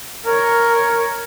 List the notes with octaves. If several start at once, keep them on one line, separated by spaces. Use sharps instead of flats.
A#4 C#5